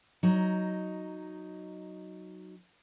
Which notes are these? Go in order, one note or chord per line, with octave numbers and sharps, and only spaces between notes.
F#3 D#4